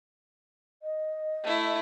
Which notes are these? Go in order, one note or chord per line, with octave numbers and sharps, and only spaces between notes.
D#5
A3 E4